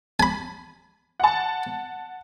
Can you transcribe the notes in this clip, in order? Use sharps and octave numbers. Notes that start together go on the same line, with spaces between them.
G#5 B5
F#5 A5